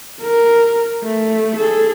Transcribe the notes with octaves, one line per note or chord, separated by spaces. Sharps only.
A#4
A3
G#4 A4